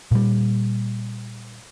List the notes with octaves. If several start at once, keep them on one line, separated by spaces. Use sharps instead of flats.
A#2 G3